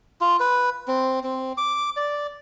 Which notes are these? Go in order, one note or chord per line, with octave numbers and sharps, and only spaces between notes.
F4
B4
C4
C4
D6
D5